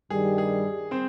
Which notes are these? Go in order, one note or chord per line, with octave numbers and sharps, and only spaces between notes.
G2 D#3 G3 G#4
G#4
C4 C5